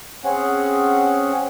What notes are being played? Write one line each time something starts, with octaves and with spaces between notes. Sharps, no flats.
C4 C#4 G#4 F#5